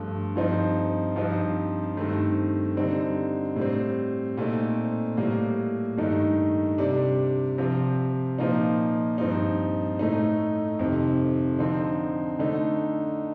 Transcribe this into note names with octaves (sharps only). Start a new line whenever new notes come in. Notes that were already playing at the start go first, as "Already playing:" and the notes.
Already playing: G2 F3 A3
G2 F3 C4 D#4
G2 F3 C4 D#4
G2 D#3 A3 C4
D3 G3 C4 D#4
A2 G3 C4
A#2 A3 C4 D#4
A2 G3 A#3
G2 D#3 A3 D#4
C3 G3 D4
C3 F3 C4
A#2 F3 A#3 D#4
G2 F3 C4 D#4
A2 A3 D#4
F2 C3 D#3
D3 F3 C4 D#4
D3 A3 D#4